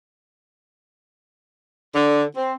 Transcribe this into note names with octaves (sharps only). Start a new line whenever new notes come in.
D3
C4